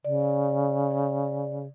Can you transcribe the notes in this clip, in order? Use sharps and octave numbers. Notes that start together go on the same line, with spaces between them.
C#3 D5